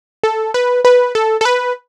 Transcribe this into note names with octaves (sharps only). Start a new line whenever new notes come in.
A4
B4
B4
A4
A4
B4